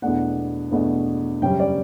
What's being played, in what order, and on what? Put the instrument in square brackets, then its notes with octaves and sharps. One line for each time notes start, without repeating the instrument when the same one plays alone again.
[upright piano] E2 B2 A3 D4 F#5
E2 B2 A3 D4
F#2 C#3 G3 C#4 G5
D5